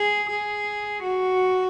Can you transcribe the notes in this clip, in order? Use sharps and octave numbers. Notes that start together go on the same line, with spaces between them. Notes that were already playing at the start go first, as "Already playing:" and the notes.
Already playing: G#4
G#4
F#4